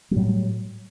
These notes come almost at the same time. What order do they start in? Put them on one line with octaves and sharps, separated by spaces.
F#3 G3 A2